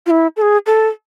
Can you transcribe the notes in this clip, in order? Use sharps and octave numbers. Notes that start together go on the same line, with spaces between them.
F4
E4
A4
G#4
A4